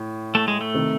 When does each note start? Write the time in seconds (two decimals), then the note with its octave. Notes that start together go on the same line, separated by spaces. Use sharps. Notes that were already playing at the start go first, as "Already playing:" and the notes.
Already playing: A2
0.35 A3
0.48 G#3
0.61 A3
0.74 C3 D#3